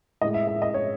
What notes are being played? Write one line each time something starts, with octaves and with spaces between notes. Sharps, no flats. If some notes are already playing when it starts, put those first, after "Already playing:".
A2 G#3 D#5
E5
E5
D#5
C#5